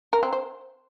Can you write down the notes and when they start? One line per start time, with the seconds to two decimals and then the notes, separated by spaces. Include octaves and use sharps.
0.13 A#4
0.23 C4
0.33 C5